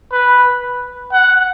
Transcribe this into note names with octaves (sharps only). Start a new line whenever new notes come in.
B4
F#5